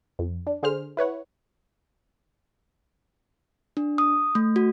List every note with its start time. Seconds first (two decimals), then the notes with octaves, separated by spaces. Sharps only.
0.19 F2
0.47 D4
0.63 D3 G#4 C5 F6
0.97 E4 B4 C#5 F#5
3.77 D4
3.98 D#6
4.35 A3
4.56 F#4